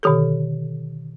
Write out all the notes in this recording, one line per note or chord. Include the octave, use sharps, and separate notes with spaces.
B2 D3 D#3 G4 A4